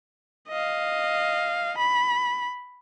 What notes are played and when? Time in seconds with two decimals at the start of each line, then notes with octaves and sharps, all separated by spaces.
0.49 D#5 F5
1.78 B5